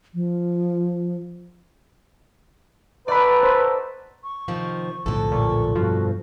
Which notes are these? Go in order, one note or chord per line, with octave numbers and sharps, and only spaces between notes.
F3
D#4 F#4 A4 B4 D5 B5
C5
C#6
C3 D#3 F3
B1 F2 A2 D3 A4
A#2 C#6
G2 B2 F3 F#4